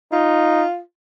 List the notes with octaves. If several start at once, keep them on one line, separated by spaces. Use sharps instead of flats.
D#4 F4